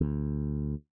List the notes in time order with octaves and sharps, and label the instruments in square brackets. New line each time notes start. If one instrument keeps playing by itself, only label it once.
[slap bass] D2